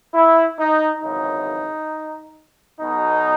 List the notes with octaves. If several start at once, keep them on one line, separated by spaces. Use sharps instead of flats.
E4
D#4
G#1 F#2 C#3 E3 D#4
B1 B2 D#4